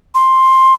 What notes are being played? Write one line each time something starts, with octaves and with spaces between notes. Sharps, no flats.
C6